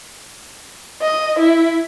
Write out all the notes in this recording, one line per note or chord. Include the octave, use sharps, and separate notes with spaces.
D#5
E4